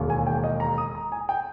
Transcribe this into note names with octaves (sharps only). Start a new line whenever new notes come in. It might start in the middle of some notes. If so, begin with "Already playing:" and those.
Already playing: E1 D#2 C#3
G#5
G5
D#5
A#5
D#6
A#5
G#5
G5